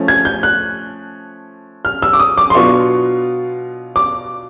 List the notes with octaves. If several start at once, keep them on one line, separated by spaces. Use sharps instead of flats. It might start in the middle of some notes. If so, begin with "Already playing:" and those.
Already playing: F3 A3 C#4
G#6
G6
F#6
F6
E6
D6
D#6
D6
C6
B2 F#3 B3 D4 F4 C#6
D6